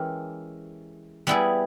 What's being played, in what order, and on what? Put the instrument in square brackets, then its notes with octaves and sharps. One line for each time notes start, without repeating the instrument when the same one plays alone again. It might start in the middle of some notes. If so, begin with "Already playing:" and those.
Already playing: [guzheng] E3 G#3 C#4 G4 A#4
G3 B3 E4 G#4